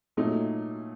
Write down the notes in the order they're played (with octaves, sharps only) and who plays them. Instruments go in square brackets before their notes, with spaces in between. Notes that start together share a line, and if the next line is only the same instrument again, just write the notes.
[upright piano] A#2 F#3 A3 D#4